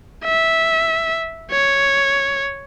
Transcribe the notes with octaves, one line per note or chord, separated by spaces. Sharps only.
E5
C#5